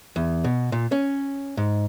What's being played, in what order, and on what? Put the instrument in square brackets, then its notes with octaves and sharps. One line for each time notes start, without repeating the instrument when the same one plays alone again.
[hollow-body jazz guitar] E2
B2
A#2
C#4
G#2